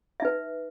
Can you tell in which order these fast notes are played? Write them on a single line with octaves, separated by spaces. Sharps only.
E5 D#4 B4